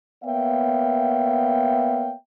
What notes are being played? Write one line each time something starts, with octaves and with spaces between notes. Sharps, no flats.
A#3 B3 C#5 E5 F5 G5